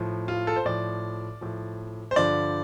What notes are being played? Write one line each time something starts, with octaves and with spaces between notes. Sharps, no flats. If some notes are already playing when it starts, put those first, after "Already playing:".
Already playing: A2 F3
F4
A4
C5
A2 F3 D5
A2 F3
C5
G2 D3 F3 D5